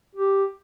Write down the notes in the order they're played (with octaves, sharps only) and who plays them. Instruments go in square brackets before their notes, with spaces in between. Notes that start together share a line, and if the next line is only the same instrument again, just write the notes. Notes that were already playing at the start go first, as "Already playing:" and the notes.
[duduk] G4